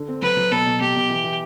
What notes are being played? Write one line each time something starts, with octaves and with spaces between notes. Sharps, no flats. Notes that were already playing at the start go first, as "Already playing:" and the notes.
Already playing: D3
C4
F#3 B4
F#3
B2 A4
B2
B2 G4
B2
E3
E3